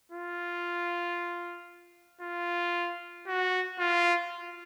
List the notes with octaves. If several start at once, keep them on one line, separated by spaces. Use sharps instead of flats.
F4
F4
F#4
F4